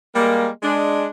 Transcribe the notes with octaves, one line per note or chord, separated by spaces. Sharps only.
G3 G#3 A#3
G#3 D4